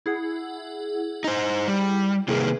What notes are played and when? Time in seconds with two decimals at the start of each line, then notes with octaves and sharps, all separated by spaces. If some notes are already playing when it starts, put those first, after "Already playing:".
0.06 E4 G#4 F#5
1.24 D#4 C5
1.68 G3
2.28 C3 D#3 A#3 E4 G#4 B4